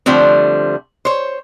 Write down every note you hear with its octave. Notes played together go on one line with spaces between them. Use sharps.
D3 F3 G3 A3 C4
C5 C#5